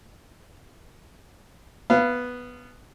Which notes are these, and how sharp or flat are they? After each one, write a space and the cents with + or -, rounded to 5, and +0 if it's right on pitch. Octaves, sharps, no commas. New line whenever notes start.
B3 +0 F5 -25